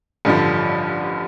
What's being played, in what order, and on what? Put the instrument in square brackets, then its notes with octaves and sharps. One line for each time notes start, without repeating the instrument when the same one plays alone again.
[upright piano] A1 G2 D3 F3